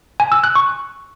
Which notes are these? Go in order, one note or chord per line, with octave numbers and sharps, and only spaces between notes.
G#5
E6
F#6
C#6